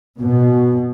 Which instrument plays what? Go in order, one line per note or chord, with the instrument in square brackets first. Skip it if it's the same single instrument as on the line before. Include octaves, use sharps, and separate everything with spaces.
[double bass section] B2